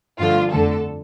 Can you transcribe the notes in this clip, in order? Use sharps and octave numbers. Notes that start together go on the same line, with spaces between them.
G2 D3 F3 A3 F4
F2 D3 A3 A4